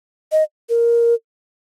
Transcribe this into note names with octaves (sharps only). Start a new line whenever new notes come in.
D#5
A#4